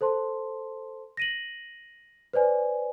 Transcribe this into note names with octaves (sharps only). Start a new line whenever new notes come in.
A4 C5 A5 C6
A#6 D#7 F#7
B4 C5 D5 G#5